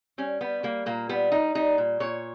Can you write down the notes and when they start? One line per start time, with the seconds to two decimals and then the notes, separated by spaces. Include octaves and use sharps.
0.18 G3 C#4
0.41 G3 B3
0.63 G3 A#3
0.86 A#2 A#3
1.09 G3 B3
1.32 G3 D#4
1.55 G3 D#4
1.78 A#2
2.00 A#2 C#5